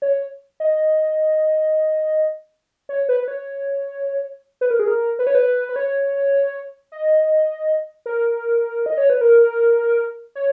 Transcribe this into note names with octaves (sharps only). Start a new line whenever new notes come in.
C#5
D#5
C#5
B4
B4
C#5
B4
A#4
G#4
A#4
B4
C#5
B4
B4
C#5
D#5
A#4
D#5
C#5
B4
A#4
C#5